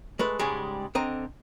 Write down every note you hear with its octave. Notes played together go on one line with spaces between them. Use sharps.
G#3 A3 B4
G#2 C#3 G3 G#3
D3 C4 D#5 A#5